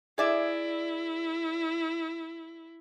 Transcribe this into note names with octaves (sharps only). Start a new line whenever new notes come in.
E4 G#4 D5 E5